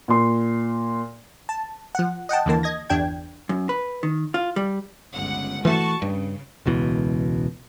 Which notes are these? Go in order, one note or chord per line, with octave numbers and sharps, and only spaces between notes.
A#2 C6
A5
F3 F#5
D#5 F#5 G5 A5
D#2 D3 E3 A#3 A5
D#5 G#6 A#6
G1 E2 D4 G5 G#6
F#2
B4
D#3
F4
G3
G1 C#2 F#5
E3 A3 F#4 A5 C#6
G2 C#3
E1 C#2 B2 E3